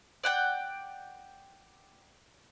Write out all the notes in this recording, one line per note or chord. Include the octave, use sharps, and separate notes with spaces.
D5 F#5 G5